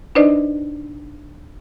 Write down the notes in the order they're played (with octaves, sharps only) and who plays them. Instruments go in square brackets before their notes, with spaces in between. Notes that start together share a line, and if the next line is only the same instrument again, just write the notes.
[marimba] D4 D#4 B4 C5 D5 D#5